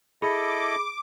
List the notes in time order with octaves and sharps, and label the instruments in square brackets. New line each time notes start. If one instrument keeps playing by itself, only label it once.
[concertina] E4 A4 D#5 [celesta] G#4 B5 [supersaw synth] D6